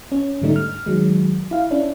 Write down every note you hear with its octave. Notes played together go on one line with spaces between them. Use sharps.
C#4
G#2 D3 G3 A3 D#4
F6
D#3 F#3 G#3
E4 F5
C#4 D4 E4